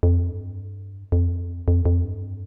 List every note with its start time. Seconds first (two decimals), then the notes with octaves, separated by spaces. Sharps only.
0.03 F2
0.30 G2
1.12 F2
1.68 F2
1.85 F2
2.04 G2